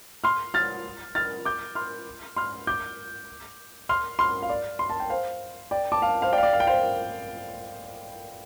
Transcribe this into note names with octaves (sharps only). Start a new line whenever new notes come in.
C6 F6
F6 A6
F6 A6
D6 G6
C6 F6
C6 F6
D6 G6
C6 F6
C6 F6
F5
D5
C6
A5
G5
C5 F5
D5 G5
A5 D6
F5 A5
C5 F5
D5 G5
F5
D5
F5
G5
C5 F5